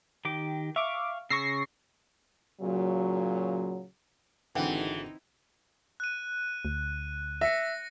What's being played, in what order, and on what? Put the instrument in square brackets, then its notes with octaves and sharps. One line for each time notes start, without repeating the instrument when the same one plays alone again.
[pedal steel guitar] D#3 G4 D6
[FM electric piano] E5 D6 [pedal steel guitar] F5 C#6
[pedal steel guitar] C#3 E6 [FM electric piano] C#6 A#6 C7
[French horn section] A#2 C#3 F#3
[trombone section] G#1 [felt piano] D3 F#5 G5 [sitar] E3 [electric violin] C4 D#4
[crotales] F#6 D#7
[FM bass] D2
[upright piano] E5 [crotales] A#6 C#7